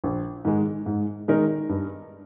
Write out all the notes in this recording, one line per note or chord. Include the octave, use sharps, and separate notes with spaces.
A#1
G#2 D#3 G#3
G#2
D#3 G#3 D#4 A#4
G2